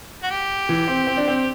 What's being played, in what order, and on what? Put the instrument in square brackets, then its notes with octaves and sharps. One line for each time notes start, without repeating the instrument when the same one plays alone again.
[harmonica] F#4
G4
[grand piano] E3
C4
C4
D4
C4